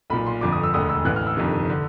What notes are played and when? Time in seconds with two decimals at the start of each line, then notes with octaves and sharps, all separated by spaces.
0.10 B1 A#2 B5
0.26 C6
0.41 G1 F2 D3 D6
0.52 D#6
0.63 E6
0.74 E1 D2 D3 D#6
0.89 E6
1.05 A1 A2 E3 F#6
1.16 F6
1.27 E6
1.37 G1 F2 C3 D#3
1.70 D3